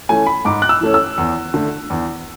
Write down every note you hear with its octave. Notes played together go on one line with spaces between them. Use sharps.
E3 A3 C#4 G#5
B5
G#2 D6
F#6
E6
E3 A3 C#4
E6
E2
D3 A3
E2